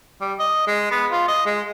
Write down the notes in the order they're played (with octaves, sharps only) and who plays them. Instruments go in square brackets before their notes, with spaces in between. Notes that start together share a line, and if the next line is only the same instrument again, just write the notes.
[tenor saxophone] G3
D#5
G#3
B3
F4
D#5
G#3